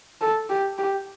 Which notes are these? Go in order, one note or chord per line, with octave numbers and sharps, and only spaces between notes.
A4
G4
G4